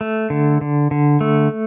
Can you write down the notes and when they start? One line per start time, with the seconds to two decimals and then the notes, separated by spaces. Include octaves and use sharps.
0.01 A3
0.30 D3
0.61 D3
0.91 D3
1.21 A3